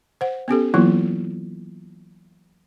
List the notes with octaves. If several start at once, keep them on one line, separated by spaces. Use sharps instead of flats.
C5 F#5
B3 C#4 G4 A4
E3 F#3 A#3 B3 E4 F4